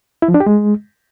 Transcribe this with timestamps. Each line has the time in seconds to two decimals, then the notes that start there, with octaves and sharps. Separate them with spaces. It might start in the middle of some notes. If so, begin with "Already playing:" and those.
0.22 E4
0.28 F3
0.34 D4
0.40 G4
0.46 G#3